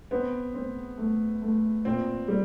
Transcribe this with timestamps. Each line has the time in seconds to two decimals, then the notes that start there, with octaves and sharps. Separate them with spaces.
0.11 B3 C4
0.54 C4
0.98 A3
1.42 A3
1.85 A#2 C4
2.28 G3